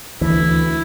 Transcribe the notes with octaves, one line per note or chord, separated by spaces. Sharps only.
D2 E3 E4